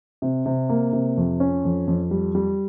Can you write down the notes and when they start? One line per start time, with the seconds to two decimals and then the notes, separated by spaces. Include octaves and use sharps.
0.22 C3
0.46 C3
0.69 A#3
0.93 C3
1.17 F2
1.40 C#4
1.65 F2
1.87 F2
2.11 G3
2.35 G3